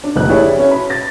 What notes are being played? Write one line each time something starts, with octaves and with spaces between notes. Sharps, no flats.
D4
F1 A#1 F#6
E4 G4 G#4 C#5 D5 E5
C#4 F#4 B4
B5
A6 A#6